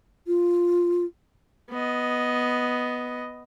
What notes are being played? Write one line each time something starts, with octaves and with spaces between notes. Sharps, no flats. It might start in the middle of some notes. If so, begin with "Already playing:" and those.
F4
B3 D#5